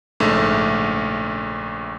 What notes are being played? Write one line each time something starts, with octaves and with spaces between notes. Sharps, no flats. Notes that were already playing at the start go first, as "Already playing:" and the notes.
A#1 G#2 C#3 A3